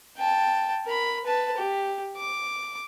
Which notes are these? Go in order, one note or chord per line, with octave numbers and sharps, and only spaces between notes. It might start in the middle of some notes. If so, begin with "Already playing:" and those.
G5 A5
A#4 B5
B4 A5
G4
D6